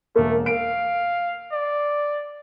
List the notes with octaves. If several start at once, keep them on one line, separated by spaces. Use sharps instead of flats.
E1 A3 A#3
F5 D7
D5